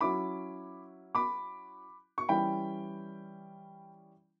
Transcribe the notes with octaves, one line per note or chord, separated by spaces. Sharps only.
F#3 C#4 E4 B5 D6
B5 D6
C#6
E3 G3 C#4 E4 G5 B5